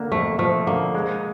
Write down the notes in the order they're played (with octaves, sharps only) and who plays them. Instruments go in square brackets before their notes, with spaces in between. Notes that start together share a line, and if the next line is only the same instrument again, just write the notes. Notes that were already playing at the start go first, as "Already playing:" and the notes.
Already playing: [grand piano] D3 A#3
[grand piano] F2 [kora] A3
[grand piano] F3 [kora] A3
[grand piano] D3 [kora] A#3
[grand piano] G#3